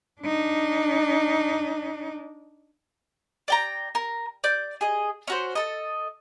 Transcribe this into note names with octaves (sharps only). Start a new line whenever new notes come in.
D4 D#4
D5 G5 A#5
A#4
D5 G6
G#4 D#5
C#4 F#4 C5
A4 D#5